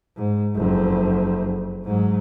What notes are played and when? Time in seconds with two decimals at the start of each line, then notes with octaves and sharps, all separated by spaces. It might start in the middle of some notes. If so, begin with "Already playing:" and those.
0.17 G#2
0.55 F#1 F2
1.84 G#2 F#3